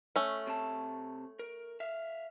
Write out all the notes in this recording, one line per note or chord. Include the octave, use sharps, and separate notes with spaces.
A3 C#4
C3 A5
A#4
E5 F5